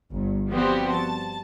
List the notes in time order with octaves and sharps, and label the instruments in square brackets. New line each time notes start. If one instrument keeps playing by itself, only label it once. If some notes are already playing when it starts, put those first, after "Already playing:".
[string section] G1 G2
F3 G3 B3 C4 F#4 G4
A5